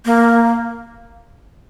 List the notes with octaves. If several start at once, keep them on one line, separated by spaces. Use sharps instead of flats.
A#3